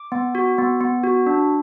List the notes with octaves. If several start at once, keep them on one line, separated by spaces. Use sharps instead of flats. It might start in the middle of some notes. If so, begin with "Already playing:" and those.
Already playing: D6
B3
F#4
B3
B3
F#4
D4